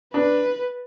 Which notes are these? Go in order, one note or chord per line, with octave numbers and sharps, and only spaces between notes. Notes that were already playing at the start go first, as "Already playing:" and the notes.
D4 B4